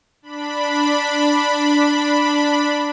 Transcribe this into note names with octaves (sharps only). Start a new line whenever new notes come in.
D4 B5